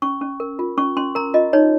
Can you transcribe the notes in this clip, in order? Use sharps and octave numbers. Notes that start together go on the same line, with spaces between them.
C#4 C#6
C#4
A#4
F4
C#4 C#6
C#4 C6
A#4 A#5
F4 D#5
D#4 C#5